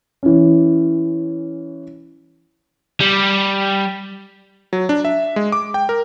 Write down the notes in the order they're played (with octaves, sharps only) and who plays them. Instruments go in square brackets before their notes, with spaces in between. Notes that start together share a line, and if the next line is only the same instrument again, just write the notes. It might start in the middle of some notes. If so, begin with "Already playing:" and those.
[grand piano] E3 C#4
[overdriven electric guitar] G3
[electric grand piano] F#3
D4
E5
G#3
D6
G5
A#4